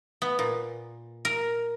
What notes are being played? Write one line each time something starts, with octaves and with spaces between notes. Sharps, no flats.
B3
A#2
A#4